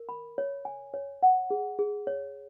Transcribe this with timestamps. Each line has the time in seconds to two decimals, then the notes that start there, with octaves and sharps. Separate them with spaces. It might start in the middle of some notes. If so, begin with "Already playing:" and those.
Already playing: A#4
0.09 B5
0.38 C#5
0.65 G#5
0.94 C#5
1.23 F#5
1.51 G#4
1.79 G#4
2.07 C#5